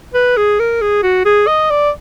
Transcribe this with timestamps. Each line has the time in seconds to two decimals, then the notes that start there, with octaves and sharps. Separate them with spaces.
0.14 B4
0.37 G#4
0.60 A#4
0.81 G#4
1.03 F#4
1.25 G#4
1.47 D#5
1.70 D5